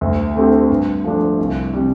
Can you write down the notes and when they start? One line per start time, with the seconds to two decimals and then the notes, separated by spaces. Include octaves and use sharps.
0.01 D2
0.35 D3 A3 C4 G4
0.70 G2
1.04 F3 A3 D4
1.39 C2
1.73 C3 G3